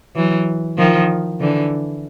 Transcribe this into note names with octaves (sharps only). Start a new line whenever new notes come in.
E3 F#3
D#3 F3
D3 E3